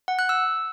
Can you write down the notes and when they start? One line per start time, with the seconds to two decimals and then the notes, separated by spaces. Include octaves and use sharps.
0.08 F#5
0.19 F#6
0.29 E6